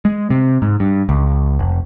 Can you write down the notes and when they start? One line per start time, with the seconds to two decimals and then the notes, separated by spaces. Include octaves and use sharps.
0.05 G#3
0.30 C3
0.62 G#2
0.80 G2
1.09 C#2
1.59 F1